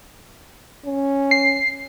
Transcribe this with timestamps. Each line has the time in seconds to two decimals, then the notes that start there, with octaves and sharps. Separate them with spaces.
0.86 C#4
1.31 C7